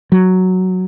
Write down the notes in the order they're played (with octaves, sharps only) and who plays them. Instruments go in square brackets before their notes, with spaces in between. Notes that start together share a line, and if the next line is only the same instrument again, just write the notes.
[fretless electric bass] F#3